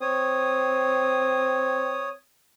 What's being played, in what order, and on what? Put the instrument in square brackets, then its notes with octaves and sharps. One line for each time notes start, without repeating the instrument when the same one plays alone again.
[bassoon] C4 [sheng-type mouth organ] C#5 D#6